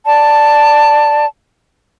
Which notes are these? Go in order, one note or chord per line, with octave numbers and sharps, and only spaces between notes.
D5 A5